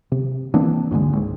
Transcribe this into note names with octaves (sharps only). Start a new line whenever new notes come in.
C3
E3 A#3 C4 D4
C#2 G2 D3 G#3
G#1 C#2